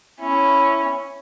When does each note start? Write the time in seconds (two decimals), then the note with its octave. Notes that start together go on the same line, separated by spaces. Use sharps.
0.21 C#4 E4